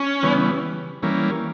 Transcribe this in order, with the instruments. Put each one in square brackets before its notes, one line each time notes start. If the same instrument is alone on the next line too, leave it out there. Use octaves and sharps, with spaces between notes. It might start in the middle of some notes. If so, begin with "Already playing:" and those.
Already playing: [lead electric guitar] C#4
[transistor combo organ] C#3 E3 G3 B3
E3 G3 A#3 C#4